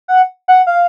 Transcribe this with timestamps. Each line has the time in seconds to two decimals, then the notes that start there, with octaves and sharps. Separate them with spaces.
0.08 F#5
0.48 F#5
0.67 F5